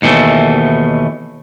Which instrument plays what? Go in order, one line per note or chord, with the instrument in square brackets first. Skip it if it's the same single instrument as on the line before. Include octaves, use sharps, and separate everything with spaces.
[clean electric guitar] D#2 B2 E3 A3